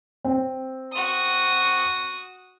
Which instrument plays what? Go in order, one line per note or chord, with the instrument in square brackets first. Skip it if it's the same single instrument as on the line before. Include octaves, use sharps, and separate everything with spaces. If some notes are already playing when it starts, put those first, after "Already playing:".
[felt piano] C4
[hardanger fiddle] F#4 D#6